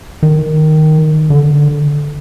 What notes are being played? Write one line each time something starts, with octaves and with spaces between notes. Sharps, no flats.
D#3
D3